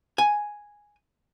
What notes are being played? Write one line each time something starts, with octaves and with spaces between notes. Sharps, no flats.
G#5